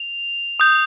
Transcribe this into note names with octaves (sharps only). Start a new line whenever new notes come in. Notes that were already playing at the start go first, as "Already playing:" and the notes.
Already playing: F7
D#6 G6